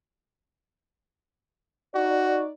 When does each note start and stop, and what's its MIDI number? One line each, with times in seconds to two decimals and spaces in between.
1.95 2.52 63
1.95 2.43 66
1.95 2.52 74